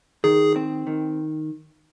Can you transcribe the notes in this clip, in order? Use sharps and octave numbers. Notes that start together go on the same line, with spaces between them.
D#3 G#4
C4
D#3